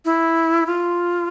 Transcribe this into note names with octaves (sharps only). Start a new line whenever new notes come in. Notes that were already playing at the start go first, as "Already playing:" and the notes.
E4
F4